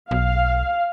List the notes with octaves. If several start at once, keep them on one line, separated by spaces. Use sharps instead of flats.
B1 F5